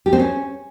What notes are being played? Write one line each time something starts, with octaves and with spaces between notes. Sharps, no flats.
G4
C4
C#4